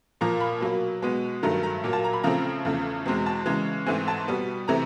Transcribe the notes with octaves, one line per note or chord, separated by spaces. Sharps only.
A#2 F3 A#3 A#5
B5
B2 F#3 A#3
B2 G#3 B3
G2 D#3 F#3 A3 A#5
A#5
A#2 F#3 A#3
A5
A#5
B5
C#3 F3 A3 C4 A#5
E2 C#3 F3 A3
E2 B2 G#3 C4
A5
C#3 E3 G#3
G#2 E3 A3 C4 G#5
A5
B2 G3 B3
C3 E3 A3 C4 A#5